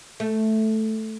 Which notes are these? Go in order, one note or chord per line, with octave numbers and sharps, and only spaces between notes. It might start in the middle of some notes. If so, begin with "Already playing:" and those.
A3